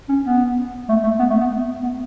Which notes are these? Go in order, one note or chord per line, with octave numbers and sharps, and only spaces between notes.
C#4
B3
A3
A3
B3
A3
B3
B3